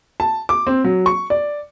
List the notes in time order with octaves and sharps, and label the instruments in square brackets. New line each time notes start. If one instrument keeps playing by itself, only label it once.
[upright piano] A5
D6
C4
F#3
C#6
D5